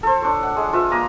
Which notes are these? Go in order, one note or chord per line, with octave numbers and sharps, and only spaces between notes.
A4 C5
D4 C#5
F#5
G#3
F4 B4 E5
A#3 G#5 A#5 D#6